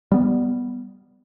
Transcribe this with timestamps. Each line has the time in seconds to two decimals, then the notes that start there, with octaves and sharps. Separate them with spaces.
0.12 G3 B3